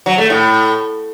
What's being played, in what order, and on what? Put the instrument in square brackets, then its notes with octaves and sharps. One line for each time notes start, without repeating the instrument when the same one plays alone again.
[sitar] F#3
A3
A2